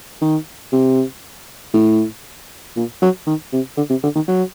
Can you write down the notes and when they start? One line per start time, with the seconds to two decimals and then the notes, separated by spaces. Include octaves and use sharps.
0.22 D#3
0.72 C3
1.74 A2
2.76 A#2
3.02 F#3
3.27 D#3
3.53 C3
3.77 D3
3.90 C3
4.03 D3
4.15 D#3
4.28 F#3